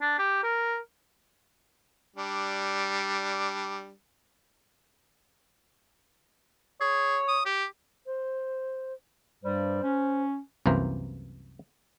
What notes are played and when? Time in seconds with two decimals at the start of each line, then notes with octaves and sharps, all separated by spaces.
0.01 D4
0.19 G4
0.44 A#4
2.16 G3 D4
6.81 G#4 C#5
7.28 D#6
7.46 G4
8.06 C5
9.43 G2 G3 C5
9.83 C#4
10.66 C2 F#2 E3 A#3 C5